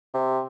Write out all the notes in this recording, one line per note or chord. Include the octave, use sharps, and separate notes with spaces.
C3